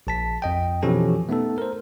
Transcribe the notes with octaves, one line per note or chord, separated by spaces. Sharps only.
A#1 A5 B6
F2 D#5 G5
B2 E3 F3 C#4 G4 A4
A3 B3 D#4 A4
A#4 C5